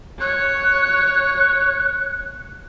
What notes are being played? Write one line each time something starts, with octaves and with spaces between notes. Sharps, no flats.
C#5 F#6